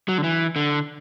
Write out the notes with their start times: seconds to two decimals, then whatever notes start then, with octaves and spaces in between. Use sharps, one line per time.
0.08 F#3
0.18 D3
0.24 E3
0.56 D3